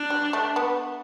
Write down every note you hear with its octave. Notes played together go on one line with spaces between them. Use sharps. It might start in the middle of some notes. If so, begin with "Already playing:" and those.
Already playing: D4
G3
A3
B3